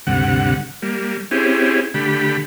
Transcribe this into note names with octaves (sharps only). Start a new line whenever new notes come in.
D2 G2 C3 F#5
G3 A#3
C4 C#4 E4 G4 G#4
D3 A3 G4 B5